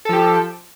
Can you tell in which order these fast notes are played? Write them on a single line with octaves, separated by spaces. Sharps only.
A4 F3 G4